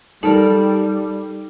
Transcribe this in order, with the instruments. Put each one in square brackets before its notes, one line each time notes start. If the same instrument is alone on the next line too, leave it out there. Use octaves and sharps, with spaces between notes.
[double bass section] G3 [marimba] D#4 [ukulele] A4 A#4